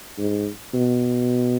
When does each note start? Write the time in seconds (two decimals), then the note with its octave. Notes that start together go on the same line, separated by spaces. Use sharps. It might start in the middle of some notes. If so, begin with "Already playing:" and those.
0.18 G#2
0.74 B2